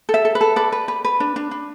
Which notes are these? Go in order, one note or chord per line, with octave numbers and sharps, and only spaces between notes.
A4
E5
A4
B4
A4
B4 D5
B4
B4
B4
D4
D4
D4